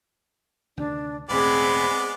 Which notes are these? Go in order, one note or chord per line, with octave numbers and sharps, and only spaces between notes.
D2 C3 D#3 D4
E1 A1 G#3 B3 C4 G#4 D5 B5